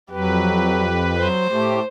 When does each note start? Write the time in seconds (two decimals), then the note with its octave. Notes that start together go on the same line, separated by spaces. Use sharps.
0.11 F2 F#3 G4 B4
1.18 F#3 C5
1.50 A2 A3 G4